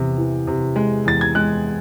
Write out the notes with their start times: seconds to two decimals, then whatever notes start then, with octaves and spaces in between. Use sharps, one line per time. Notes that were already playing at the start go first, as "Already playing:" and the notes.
Already playing: E2 C3
0.17 E3
0.47 C3
0.76 G#3
1.05 E2 A6
1.21 G#6
1.35 G#3 F#6